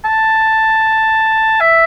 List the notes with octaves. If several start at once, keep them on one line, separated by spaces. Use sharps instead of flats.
A5
E5